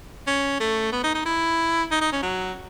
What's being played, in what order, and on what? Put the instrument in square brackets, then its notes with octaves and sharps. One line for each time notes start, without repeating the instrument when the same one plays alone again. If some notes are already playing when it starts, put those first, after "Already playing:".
[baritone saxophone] C#4
A3
B3
D#4
D#4
E4
D#4
D#4
C#4
F#3